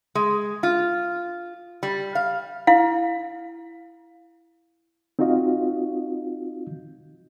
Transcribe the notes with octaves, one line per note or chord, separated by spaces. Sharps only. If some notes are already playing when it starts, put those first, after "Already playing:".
G#3
F4
G3
F5
E4 F5
C4 D#4 F4 F#4 D#5 F5